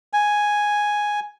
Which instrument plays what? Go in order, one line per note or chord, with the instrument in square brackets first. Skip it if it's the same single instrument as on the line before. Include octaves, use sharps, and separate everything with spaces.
[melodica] G#5